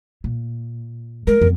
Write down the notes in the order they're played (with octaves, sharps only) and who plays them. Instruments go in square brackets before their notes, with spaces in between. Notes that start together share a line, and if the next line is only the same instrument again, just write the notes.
[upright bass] A#2
[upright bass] G#3 [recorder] A#4
[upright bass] F2 B3